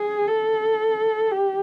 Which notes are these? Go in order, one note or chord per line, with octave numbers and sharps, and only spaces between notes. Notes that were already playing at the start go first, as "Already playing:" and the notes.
Already playing: G#4
A4
G4